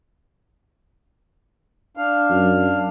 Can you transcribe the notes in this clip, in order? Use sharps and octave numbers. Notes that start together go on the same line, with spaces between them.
D4 F5
F#2